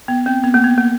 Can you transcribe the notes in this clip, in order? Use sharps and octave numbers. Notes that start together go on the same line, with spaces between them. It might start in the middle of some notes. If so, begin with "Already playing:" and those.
B3
C4
B3
A#3
B3
A#3